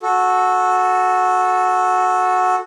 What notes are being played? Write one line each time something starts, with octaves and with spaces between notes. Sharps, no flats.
F#4 A4